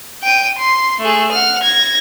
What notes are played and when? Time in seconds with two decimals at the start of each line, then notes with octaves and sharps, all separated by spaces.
0.23 G5 D#7
0.59 C6
1.00 A3 G#4
1.32 F#5 F6
1.63 G#6 A#6